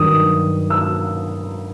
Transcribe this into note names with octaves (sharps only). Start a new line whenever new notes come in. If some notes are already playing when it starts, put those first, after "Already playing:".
Already playing: G2 D#3 F#3 D#6
E6